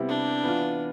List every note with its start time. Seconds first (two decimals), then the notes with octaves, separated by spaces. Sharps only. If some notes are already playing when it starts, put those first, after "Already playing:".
Already playing: C3 G3 B3 E4 G4
0.09 D4
0.44 E3 B3 F4